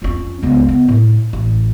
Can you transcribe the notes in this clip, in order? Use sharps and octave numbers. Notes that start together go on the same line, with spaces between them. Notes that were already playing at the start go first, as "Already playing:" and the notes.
F2 C#4
C#2 B3
B3
A2
A1